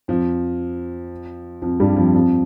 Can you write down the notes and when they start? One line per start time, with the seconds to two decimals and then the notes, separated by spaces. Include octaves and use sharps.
0.08 F2 F3
1.62 F2 F3
1.80 G2 G3
1.97 F2 F3
2.14 F2 F3